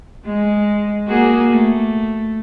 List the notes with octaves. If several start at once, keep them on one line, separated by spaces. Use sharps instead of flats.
G#3
A#3 F#4 G#4
A3